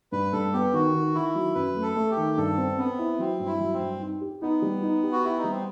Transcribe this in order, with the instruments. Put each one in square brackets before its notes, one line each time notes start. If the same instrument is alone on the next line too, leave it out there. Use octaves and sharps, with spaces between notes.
[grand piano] G2 [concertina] B4
[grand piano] G2 [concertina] A4
[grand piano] B3 [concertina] G4
[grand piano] D#3 [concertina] F#4
[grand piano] D#3
[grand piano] D#3 [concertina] E4
[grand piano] F#3
[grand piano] F#2 [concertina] B4
[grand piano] A3
[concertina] A4
[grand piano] A3
[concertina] G4
[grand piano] D#3
[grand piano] G2 [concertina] A4
[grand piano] C4
[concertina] B3 [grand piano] C4
[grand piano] E4
[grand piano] F#3 [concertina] C4
[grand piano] G2
[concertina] E4
[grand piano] F#3
[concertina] C4
[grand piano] G2
D#4
G4
[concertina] B3 [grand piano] D#4
[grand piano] G3
D#4
G4
[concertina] F#4
[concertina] E4 [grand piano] G4
[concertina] D#4
[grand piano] G3
[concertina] C4